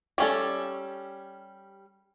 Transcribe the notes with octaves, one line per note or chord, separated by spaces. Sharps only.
G3 C#4 A4